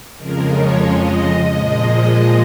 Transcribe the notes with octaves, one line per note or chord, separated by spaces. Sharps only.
F2 C#3 F3 G#3 A#4
C#5
D#5
A#2 F3 G#3